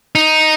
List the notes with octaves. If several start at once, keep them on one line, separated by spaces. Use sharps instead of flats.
D#4